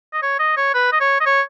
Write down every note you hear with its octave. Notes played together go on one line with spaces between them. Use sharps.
D#5
C#5
D#5
C#5
B4
D#5
C#5
D#5
C#5